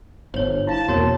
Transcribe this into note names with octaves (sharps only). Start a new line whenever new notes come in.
G1 C5 C#5
E4 F5 A5
E2 B2 A#3 F#4 A#4 C#5